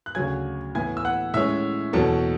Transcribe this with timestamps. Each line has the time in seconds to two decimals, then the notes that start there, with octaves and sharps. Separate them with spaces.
0.06 F#6
0.15 D2 C#3 F#3 G#5 G#6
0.75 A2 E3 B3 E4 G#5 G#6
0.97 E6
1.05 F#5 F#6
1.34 A2 G#3 C#4 E5 E6
1.93 E2 B2 F#3 A4 A5